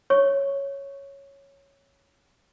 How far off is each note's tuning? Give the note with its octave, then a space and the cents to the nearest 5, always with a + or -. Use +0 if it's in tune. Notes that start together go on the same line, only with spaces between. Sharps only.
C#5 +0 C#6 +0